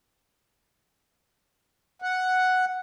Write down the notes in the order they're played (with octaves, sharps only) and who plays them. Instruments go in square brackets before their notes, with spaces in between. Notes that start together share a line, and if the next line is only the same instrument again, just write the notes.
[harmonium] F#5